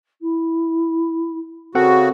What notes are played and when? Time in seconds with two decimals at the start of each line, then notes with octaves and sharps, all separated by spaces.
0.21 E4
1.75 C#3 C4 F#4 A4 A#4 F#5